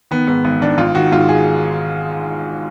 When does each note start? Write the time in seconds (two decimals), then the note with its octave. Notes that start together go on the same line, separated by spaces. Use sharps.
0.11 D#3 B3
0.27 G#2 B3
0.44 G#1 B3
0.62 D#3 D4
0.78 G#1 F4
0.95 D#3 F#4
1.11 G#2 F4
1.29 G#4